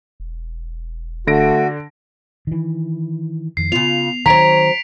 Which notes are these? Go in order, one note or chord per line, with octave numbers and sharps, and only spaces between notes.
E1
D3 A3 F#4 A#6 D7
D#3 E3
F2 D#3 C7
C#3 B3 F4 F7
D#3 F#3 C4 A#5 B6 D7